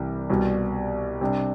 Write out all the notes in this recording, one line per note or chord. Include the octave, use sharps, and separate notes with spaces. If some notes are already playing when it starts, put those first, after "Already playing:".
Already playing: C2 C3 E3 G3
C2 B2 G3
C3 G3 D4